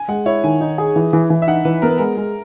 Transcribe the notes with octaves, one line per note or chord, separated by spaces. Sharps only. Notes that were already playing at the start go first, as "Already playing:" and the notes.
Already playing: G#5
G#3 F#5
E4 C#5
D#3 G#5
D#4
G#4
E3
E3
E3
E5
D#4 F#5
E3 B4
B3 A#4
B4
G#3 A#4
G#3